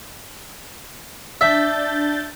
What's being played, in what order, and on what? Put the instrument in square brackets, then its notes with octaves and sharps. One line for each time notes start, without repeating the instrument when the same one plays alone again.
[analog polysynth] D4 G6 A6 [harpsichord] E5